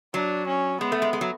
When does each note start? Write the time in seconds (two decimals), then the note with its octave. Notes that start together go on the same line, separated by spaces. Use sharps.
0.14 F#3 D4
0.47 C#4
0.81 G#3 B3
0.92 A3
1.02 G#3
1.13 G#3
1.21 F#3